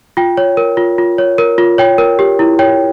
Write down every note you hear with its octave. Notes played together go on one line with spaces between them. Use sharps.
F4 G5
C#5
A#4
F4
F4
C#5
A#4
F4
C#5 G5
A#4
G4
E4
C#5 G5